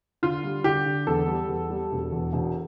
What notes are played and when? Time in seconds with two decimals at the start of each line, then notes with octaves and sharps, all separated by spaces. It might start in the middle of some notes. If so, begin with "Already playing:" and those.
0.23 D3 F4
0.44 G3
0.64 D3 G4
0.85 D3
1.07 E2 A4
1.28 G3
1.49 E2
1.70 G3
1.92 E1
2.12 E2
2.33 E1